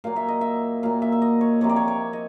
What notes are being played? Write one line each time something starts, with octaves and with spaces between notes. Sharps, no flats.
A#2 F#3 A#3 F5
E5
D#5
E5
A#2 F#3 A#3 F5
E5
E5
D#5
C#5
C3 F3 A#3 C#5
D5
C#5
C#5
D#5